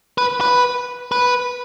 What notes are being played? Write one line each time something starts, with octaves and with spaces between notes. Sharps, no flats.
B4
B4
B4